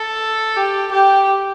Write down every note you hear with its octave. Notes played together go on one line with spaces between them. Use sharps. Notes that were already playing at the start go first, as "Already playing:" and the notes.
Already playing: A4
G4
G4